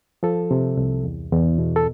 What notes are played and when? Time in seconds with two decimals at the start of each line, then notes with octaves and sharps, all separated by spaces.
0.23 F3 A4
0.51 C3
0.77 C2
1.04 E2
1.32 E2
1.58 B2
1.76 A4